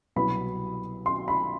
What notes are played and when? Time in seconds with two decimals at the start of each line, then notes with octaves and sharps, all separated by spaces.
0.16 C2 B2 F#3 B3 B5
1.06 C6
1.28 B5